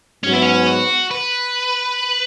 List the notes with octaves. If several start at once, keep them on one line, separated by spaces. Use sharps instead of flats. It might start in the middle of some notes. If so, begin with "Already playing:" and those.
G#2 F#3 B3 C#4
E4
C#4
F#4
B4